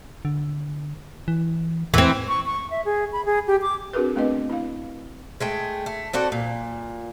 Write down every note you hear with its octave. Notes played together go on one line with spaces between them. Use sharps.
D3
E3
E2 E3 C4
C#6
C#6
E5
G#4
B5
G#4
G4
D6
C4 D4 F#4 G#4 A#4 B4
A3 B3 C4 D4 B4 D#5
E4 F5
G#3 A3 G5
A3
C4 F#4 A4 D5
A#2